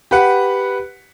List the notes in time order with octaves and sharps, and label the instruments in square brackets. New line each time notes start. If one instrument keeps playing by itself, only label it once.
[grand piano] G4 B4 F#5